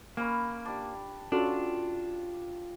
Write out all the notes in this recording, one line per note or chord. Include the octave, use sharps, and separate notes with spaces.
A#3 C#4 B4 B5
D4 G4
C#4 D4 F4 F#4 A4 F5